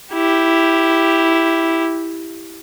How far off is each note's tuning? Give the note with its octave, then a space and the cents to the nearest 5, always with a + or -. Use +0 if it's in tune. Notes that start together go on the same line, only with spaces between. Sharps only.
E4 +0 G4 +0